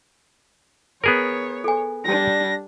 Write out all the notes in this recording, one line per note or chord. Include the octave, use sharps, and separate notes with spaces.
B3 G#4 A#4 C#5
A4 G#5
G3 D4 A#6